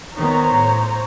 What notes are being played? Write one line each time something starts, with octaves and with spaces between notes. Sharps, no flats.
D#3 B3 C5 C#5 A#5
A2